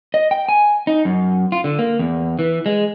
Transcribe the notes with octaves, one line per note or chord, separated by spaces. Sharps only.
D#5
G5
G#5
D#4
F#2
F4
D3
A#3
E2
E3
G#3